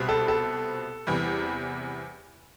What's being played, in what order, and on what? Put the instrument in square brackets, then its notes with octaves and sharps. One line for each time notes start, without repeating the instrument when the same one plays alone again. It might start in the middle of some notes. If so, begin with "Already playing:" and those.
Already playing: [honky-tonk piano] C2 B2 G3 C4
[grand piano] A4
A4
[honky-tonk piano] E2 C3 E3 G3